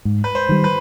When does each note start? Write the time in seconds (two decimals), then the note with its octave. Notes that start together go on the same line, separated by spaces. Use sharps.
0.05 G#2
0.24 B4
0.35 C5
0.49 D#3 G3
0.64 B4